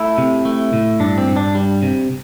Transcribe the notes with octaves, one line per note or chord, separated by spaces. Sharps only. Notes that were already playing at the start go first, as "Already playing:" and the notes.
Already playing: A3 E4
C3
A3
A2
G2 D4
C4
G2
D4
G3
C3